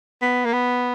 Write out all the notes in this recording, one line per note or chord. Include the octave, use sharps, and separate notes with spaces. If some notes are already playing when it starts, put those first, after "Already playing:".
B3
A#3
B3